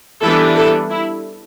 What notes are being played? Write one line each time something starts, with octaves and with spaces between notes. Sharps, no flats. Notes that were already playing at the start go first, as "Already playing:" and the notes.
E3 G3 B3 D4 E4 A4
E4 A4
E4